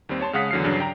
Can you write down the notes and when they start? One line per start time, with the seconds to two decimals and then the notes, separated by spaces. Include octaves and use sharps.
0.09 D#2 G3 C4
0.21 C#5 A5 C6
0.33 C#3 G#3 F5 F#5 D#6 B6
0.51 E2 D3 F#3 F6 C7
0.64 G2 C#3 F#3 D4
0.80 G5 A#5